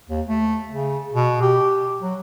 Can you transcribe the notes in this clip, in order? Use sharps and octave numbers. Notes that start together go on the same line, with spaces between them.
D#2
A3
C#3
B2
G4
F#3